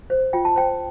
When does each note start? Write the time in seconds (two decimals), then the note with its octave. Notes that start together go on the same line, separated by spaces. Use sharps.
0.10 C5
0.33 F4 G5
0.45 A5
0.56 C5 G5